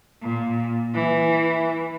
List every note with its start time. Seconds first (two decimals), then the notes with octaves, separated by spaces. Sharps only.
0.22 A#2
0.94 E3